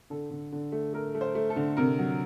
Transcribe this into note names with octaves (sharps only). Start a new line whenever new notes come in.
D3 A4
D3
D3
A3
A3 A#4
A3
C5
A3
A4
D3
C3 A#4
F#3